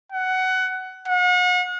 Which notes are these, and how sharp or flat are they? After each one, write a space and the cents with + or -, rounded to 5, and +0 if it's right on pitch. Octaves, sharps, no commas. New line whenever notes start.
F#5 +15
F#5 -40